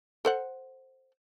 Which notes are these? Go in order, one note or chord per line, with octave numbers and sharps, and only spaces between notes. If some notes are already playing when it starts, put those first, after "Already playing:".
A4 C5 F#5